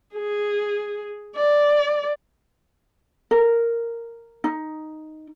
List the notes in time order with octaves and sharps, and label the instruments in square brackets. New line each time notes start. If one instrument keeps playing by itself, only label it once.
[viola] G#4
D5
[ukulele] A#4
D#4